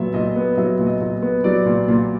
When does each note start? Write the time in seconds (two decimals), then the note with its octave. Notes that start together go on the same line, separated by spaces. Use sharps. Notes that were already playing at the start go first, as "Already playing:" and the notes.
Already playing: A#2 F#3 B3 E5
0.14 A#2 D#5
0.36 B3
0.57 F#3 E5
0.79 A#2
0.87 D#5
1.01 A#2
1.22 B3
1.44 F#3 D5
1.66 A#2
1.88 A#2